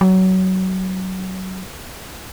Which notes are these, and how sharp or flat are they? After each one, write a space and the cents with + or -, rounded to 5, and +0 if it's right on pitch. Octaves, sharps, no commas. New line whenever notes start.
F#3 +20